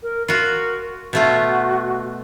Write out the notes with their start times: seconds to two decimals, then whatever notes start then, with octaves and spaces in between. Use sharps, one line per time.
0.03 A#4
0.28 F4 F#4 A#4
1.13 B2 A3 F4 F#4